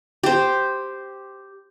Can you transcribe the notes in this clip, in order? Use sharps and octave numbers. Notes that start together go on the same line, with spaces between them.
G4 C5